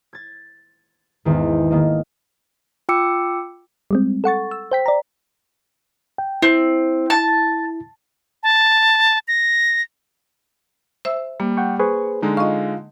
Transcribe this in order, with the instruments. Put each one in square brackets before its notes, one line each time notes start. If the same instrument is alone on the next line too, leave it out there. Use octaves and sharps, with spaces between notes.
[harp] G#6 A6
G#1 E2 D#3
D#3 A#3 D#5
[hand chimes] F4 G5 D6 E6 C#7
[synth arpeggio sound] G3 G#3 C4
A4 F#5 C#6 A6
E6
C5 G5 B6
D5 A#5
[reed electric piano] G5
[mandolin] C4 [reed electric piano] E4
[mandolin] A5
[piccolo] A5
A#6
[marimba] C5 E5 E6
[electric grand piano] G3 [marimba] A#3
[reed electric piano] F#5 G5 C#6
[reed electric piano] G#4 B4 C5 [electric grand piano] C#6
[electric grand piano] D3 G#3 D#4
[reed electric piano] F4 F5 [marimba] D#5 C#6